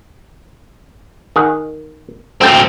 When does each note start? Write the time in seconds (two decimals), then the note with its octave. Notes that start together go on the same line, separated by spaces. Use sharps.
1.36 D#3 G#4 F#5
2.41 F#2 F#3 A3 C4 G5